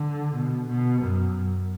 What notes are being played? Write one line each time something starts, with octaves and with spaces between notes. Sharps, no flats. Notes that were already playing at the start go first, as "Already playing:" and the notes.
Already playing: D3
B2
B2
F#2